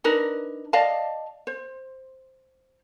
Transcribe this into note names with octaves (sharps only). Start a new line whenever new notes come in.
D4 D#4 A#4 B4
D5 D#5 F5 A5
C5